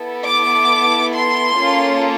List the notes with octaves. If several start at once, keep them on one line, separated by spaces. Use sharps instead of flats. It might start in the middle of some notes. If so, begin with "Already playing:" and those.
Already playing: B3 E4 A4
D6
C6
A#3 C#4 F4 A4